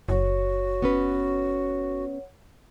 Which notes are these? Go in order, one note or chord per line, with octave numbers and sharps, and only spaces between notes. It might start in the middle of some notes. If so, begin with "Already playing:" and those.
F#1 F#4 C#5 F#5
B3 C#4 B4